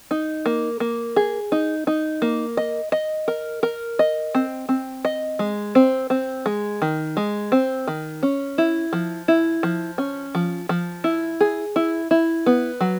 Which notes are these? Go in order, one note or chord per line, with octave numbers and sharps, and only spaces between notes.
D#4
A#3
A#3
G#4
D#4
D#4
A#3
D#5
D#5
A#4
A#4
D#5
C4
C4
D#5
G#3
C4
C4
G#3
D#3
G#3
C4
D#3
C#4
E4
F3
E4
F3
C#4
F3
F3
E4
G#4
E4
E4
B3
F#3